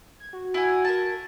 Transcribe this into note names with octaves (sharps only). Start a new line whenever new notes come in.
G#6
F#4
E4 F#5 G#5
A#4 A5